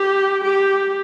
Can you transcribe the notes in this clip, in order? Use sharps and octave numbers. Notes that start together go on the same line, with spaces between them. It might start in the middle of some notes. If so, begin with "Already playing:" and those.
Already playing: G4
G4